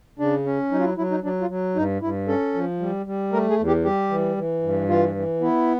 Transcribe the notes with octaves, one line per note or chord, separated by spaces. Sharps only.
C#3 D4
C#4
F#3 D#4
F4
E4
F#3 E4
D#4
F#3 D4
F4
F#3
G2 D#4
G2 E4
C#4 A4
F3
G3
G3
A3 A#4
G#4
E2
G4
G3 G4
E3
E3
G2
E3 F4
E3
B3 E4